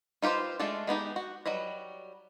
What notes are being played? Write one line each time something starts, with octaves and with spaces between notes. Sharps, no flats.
D#4 F4 G4 B4 C5
G#3 A3 D4 F4 A4
G#3 B3 D#4 G4
F#4
F#3 G3 B4 D#5